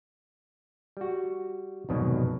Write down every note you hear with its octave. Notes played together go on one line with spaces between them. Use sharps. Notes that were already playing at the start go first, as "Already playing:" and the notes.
G3 F#4
C2 F2 G#2 B2 D#3 F#3